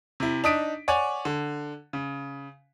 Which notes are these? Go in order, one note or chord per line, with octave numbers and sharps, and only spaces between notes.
C3 E4
D4 D#4 D#6 B6 D7
C#5 D5 F#5 G#5
D3
C#3